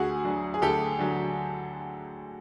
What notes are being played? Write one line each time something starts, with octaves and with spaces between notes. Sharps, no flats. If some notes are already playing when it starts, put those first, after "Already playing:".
Already playing: D2 F#4 G#4
D3 F#3
G#4
D2 G4 A4
D3 F#3